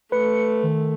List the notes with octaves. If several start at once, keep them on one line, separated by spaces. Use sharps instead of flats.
A3 B4 C#7
D#3